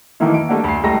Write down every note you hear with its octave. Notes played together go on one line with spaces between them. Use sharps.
D#3 E3 A3 A#3 E4
D7
G3 A3 A#3 D4 F#5
D2 C7
C#2 G3 A3 A#5 A#6